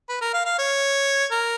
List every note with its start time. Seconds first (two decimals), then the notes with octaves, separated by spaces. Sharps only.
0.09 B4
0.21 A#4
0.34 F5
0.46 F5
0.59 C#5
1.31 A#4